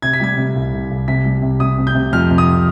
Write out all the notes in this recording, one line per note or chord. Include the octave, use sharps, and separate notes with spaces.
C3 G#6
B6
G3 G#6
C3
C2
C2
C2
C3 B6
G3
C3
C3 D#6
C3
G6
C3
F2 F6
C3
D#6